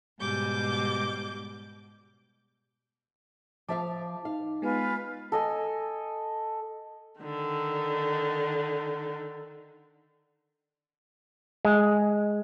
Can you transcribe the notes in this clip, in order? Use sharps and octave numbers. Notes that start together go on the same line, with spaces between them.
G#2 B2 G3 D6 G6
F3 E5 F5 A5 D6
D#4 F5
G#3 B3 F4 B4 G#5
A4 D#5 G#5
D3 D#3
G#3